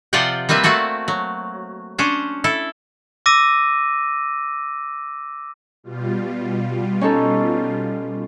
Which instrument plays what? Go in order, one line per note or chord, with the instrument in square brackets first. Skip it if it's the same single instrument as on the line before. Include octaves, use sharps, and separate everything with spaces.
[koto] C3 F3 F4 D5 F#5 G5
G3 A#3 C4 B4 E5
A3 A#3 C4 F#4 A5
F#3
C#4 D4 C5
E4 A4
[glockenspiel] D6 E6 A#6 D#7
[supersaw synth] B2 G3 F4
[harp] C#4 D#4 A4